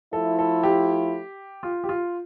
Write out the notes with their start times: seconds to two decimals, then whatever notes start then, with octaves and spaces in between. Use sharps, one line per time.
0.13 F3 A3 E4 A4
0.39 A4
0.63 G4
1.63 F4
1.84 G4
1.89 F4